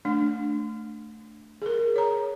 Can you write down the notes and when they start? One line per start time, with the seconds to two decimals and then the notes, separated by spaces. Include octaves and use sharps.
0.05 A3 D4
1.62 G#4 A#4
1.96 C#5 A#5